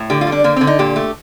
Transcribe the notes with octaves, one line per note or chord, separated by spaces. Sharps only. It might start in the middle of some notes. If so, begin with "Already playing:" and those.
Already playing: A2
D3 G4
F4
G3
D4
D3 A#3
D3 C4
D#4
A#2 G4
A3